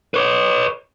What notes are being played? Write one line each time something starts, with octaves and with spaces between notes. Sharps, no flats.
B4 C#5